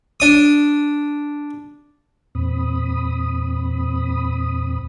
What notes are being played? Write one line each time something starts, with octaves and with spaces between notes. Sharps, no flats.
D4 D#6
E2 A#2 C4 B5 D#6